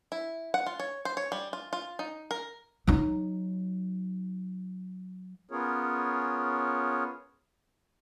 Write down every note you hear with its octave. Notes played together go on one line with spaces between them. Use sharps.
E4
F#5
F4
C#5
C5
C#5
G3
F4
F4
D#4
A#4
F#3 D#4
B3 C#4 F4 G#4 A#4 C#5